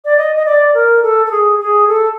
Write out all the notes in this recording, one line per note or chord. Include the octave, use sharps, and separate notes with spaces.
D5
D#5
D#5
D5
A#4
A4
A4
G#4
G#4
A4